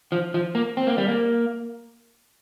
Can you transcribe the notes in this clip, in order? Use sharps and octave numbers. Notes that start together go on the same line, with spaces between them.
F3
F3
A#3
C4
A#3
G3
A#3